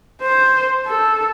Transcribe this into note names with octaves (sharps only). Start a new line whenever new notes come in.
C5
A4